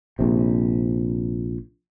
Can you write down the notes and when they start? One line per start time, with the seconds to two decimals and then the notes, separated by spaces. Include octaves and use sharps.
0.19 A#1 C3